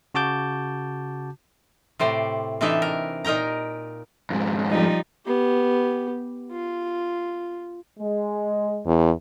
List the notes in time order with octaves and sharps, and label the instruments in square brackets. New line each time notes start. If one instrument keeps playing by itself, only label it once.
[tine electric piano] C#3 F#4 A5 D6 G6
[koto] A2 C3 C5 D5
C3 E3 D4 D#4 A4 E5
A#4
A#2 D#4 A#4 G5 A#5
[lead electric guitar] F2 G#2
[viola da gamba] F3 G3 D#4
[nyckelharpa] B3 G4
F4
[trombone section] G#3
[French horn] E2